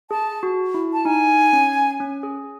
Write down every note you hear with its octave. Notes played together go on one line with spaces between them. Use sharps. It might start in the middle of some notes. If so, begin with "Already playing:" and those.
G#4 A5
F#4
E4
A5
D#4 G#5
C#4
C#4
G#4